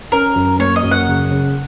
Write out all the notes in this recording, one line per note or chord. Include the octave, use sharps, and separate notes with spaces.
C#4 A#4
F#2
A#3 C#5
D#5
F#2
F#5
C#3
C#3